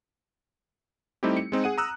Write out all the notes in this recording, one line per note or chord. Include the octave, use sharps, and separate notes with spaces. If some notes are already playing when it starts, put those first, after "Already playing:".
G3 A3 C4 D#4 E4 G4
C#7
G#3 C4 D#4
G#4 F#5 D#7
A#5 D#6 E6 F#6